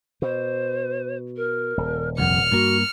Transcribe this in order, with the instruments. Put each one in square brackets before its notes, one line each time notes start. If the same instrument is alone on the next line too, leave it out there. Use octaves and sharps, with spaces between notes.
[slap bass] B2 [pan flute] C5
[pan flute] A#4
[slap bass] D#1
[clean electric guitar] C2 F2 [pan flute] F#5 [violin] F6 C#7
[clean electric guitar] G2 A#3 [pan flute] F#4